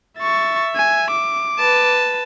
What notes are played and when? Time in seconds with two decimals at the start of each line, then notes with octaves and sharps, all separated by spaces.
0.19 E5 C#6 A6
0.76 G#5
1.11 D6
1.59 B4 A5